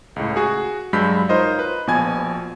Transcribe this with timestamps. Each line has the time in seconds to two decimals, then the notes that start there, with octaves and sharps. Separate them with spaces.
0.16 C#2 A2
0.36 F#4 G#4
0.93 G2 F#3 G#3 B5 G6 B6
1.29 D#4 F4 A#4 C5 C#5 D#5
1.59 B4
1.87 A#1 B2 F3 G#5 G#6